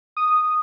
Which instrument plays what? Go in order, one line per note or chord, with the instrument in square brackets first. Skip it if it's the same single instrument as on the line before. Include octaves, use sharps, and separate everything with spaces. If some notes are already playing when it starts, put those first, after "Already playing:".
[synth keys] D#6